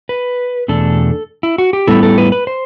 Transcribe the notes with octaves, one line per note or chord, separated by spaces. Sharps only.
B4
E2 B2 A3 D4 A4
E4
F#4
G4
A2 G3 B3 E4 A4
A4
B4
B4
C5